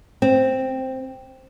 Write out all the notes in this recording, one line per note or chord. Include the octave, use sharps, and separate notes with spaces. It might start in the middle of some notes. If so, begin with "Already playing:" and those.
C4